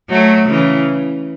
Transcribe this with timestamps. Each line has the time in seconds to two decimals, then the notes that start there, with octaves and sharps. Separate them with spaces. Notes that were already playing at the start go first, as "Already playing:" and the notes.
0.10 F#3 A3
0.50 C#3 E3